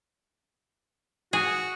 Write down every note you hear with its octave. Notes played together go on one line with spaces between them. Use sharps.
F#4 G#4